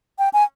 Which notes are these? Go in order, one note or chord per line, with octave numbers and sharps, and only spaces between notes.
G5
G#5